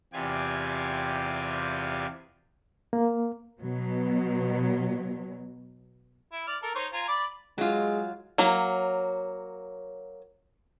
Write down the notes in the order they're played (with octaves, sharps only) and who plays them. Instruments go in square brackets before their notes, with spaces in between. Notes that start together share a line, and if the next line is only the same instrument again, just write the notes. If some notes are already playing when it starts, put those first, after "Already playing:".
[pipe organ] E2 C3 F4 G4 D5 G#5
[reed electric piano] A#3
[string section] B2 F#3
[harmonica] E4
D5 F6
A4 A#4
D#4 C5 C#5
F4 G#5 A#5
D5 B5 D6
[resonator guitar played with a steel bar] F#3 F4 [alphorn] G#3
[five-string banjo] F#3 A#3